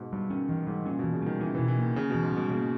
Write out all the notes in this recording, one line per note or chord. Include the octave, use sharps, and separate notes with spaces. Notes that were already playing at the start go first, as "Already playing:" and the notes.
Already playing: G#2 B2
G2 G3
D#3 C#4
D#3 E3
G#2 G3
A#2 C#4
B2 E3
C#3
D#3 G3
E3 C#4
B2 E3
E3
D#3 A#3
C#3 C#4
B2 E3
G#2
B2 G3
C#3 A#3